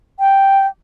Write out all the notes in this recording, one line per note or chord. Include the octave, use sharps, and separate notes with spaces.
G5